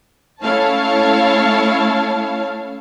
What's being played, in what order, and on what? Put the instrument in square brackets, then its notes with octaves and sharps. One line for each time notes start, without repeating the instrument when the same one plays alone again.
[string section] A3 C#4 E4 C#5 F5 A5